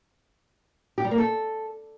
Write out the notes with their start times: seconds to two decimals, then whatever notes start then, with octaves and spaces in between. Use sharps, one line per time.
0.98 G4
1.04 G3
1.11 A#3
1.18 A4